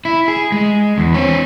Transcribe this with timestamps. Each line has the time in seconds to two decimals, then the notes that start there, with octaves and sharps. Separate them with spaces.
0.05 E4
0.28 G#4
0.52 G#3
0.98 E2
1.14 C4 C#5